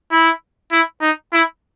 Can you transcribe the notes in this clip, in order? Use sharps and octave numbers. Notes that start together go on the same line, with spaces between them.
E4
E4
D#4
E4